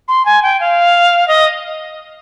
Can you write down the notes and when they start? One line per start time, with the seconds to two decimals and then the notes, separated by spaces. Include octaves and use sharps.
0.08 C6
0.25 G#5
0.43 G5
0.60 F5
1.28 D#5